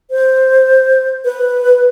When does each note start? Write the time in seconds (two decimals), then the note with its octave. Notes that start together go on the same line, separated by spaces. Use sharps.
0.11 C5
1.25 B4